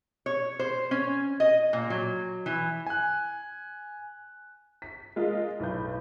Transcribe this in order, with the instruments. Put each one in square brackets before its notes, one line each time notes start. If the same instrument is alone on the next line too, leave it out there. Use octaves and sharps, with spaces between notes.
[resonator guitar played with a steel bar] C#5
C5
C#4
D#5
A#2
F#3
E3
[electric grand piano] G#5 F#6
[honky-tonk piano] B6
G#3 F4 A#4 D#5
B1 A2 B4 G6